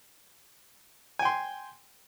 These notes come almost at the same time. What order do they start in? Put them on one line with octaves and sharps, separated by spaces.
G#5 G5 C6